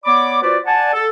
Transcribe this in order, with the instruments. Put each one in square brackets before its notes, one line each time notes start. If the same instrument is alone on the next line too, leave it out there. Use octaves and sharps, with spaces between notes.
[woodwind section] B3 C#5 D5 B5 D6
F4 F#4 B4 C5 D5
D5 F#5 G#5 A5
A4